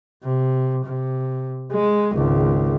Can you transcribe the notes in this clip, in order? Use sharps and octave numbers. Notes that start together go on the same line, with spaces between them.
C3
C3
G#3
G#1 C#2